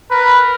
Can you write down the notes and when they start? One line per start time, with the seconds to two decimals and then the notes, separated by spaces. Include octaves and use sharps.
0.11 A#4 B4